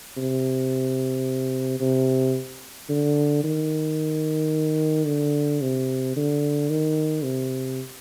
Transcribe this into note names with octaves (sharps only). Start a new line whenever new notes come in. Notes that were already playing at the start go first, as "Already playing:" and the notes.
C3
C3
D3
D#3
D3
C3
D3
D#3
C3